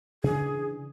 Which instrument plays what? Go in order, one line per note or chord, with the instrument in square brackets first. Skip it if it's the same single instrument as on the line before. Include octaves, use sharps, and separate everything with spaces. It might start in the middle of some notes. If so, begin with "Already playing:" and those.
[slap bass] C#3 E3 D4 [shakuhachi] G#4